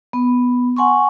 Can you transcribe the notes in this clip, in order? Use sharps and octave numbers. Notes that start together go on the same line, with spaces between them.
B3
F#5 G#5 C6 C#6